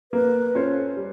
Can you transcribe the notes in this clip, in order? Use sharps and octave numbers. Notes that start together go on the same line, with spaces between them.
A#3 B4
C#4 F4 A4 C5
G3